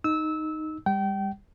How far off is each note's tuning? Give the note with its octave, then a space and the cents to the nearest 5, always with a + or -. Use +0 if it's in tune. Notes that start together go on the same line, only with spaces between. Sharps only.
D#4 +0 E6 -20
G3 +30 G5 -30